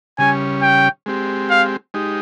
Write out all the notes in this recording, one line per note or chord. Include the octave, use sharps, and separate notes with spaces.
C#3 G3 C#4 G#5
G5
G#3 C4 G4
F5
G#3 D#4 G4